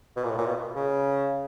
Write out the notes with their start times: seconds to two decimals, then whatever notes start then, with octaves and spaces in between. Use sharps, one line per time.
0.17 B2
0.24 A#2
0.31 A2
0.38 A#2
0.46 B2
0.75 C#3